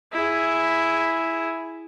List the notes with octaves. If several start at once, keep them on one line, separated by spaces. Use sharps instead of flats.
E4 G#4